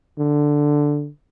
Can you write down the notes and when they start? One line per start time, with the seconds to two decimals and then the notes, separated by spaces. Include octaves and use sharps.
0.18 D3